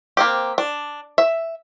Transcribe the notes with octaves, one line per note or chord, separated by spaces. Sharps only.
A#3 C4 G4
D4
E5